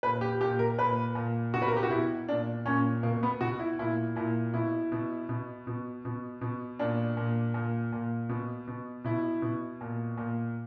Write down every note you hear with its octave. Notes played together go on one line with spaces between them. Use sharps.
A#2 B4
G4
A#2 G4
A#4
A#2 B4
A#2
B2 F#4
B4
A#4
G4
F#4
B2 E4
A#2 D4
A#2 C#4
B2 A#3
B3
B2 F#4
E4
A#2 E4
A#2 E4
B2 E4
B2
B2
B2
B2
B2
A#2 D4
A#2
A#2
A#2
B2
B2
B2 E4
B2
A#2
A#2